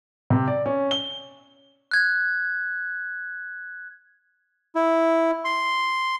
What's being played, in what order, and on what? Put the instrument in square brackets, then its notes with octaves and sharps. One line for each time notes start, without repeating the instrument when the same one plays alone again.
[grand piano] C3
D5
C#4
G7
[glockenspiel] F#6 G#6
[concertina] E4
C6